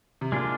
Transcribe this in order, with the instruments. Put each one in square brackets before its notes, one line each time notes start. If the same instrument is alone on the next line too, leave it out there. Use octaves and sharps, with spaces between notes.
[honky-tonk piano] C3
[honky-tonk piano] A#2 [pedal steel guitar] G#3 D4 F4